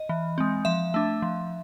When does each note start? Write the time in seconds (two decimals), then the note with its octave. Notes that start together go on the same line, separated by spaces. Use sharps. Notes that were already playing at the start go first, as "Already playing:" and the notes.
Already playing: D#5
0.09 E3
0.38 G#3 C4
0.65 F3 E5
0.94 A3 D4
1.22 F3